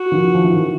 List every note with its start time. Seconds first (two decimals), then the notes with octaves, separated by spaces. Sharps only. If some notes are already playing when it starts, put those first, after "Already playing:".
Already playing: F#4
0.12 D#3 F3
0.35 F3
0.44 E3
0.54 D#3